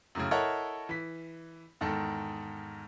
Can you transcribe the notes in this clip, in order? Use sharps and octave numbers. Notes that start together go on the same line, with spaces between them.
F#2 A2 C#3
E4 A4 A#4 C#5 D#5 F#5
E3 B6
E2 G#2 D#3 A4